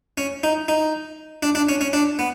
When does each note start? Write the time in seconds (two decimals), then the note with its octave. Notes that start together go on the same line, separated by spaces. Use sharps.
0.18 C#4
0.43 D#4
0.68 D#4
1.43 D4
1.55 D4
1.69 C#4
1.81 C#4
1.93 D4
2.19 B3